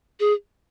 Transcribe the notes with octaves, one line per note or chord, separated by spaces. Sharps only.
G#4